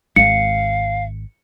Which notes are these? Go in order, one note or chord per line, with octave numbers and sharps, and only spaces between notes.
G#1 G#3 F5 C#7